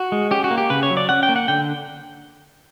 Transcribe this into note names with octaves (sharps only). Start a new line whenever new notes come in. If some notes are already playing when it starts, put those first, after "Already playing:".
Already playing: F#4
G#3
C#4 G4
F#4
A#3
G4
C#3 B4
C#5
F#3
D5
C#4 F#5
G5
A#3
F#5
D3 G5